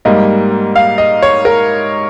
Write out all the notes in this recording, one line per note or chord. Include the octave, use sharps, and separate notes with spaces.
G#2 G3 A#3 D#5
F5
D#5
C#5
A#4